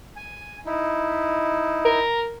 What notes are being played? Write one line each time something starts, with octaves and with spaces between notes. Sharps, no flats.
G#5
D#4 E4
A#4